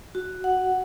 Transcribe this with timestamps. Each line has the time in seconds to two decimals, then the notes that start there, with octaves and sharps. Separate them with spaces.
0.15 F#4
0.44 F#5